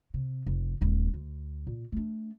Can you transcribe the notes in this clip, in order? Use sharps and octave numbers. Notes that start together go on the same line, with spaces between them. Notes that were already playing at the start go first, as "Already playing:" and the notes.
C3
F1
D#1 G#3
D2
A#2
A3 D4